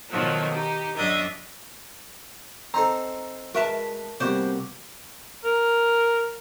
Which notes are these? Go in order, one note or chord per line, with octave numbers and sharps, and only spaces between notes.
B2 D#3 F3 F#3 A3
D#4 G4
F#2 D4 D#5 E5
C4 D#4 A4 A#5
G#3 F#4 A#4 B4 E5 A5
C3 G3 A#3 B3 F#4 C5 D5
A#4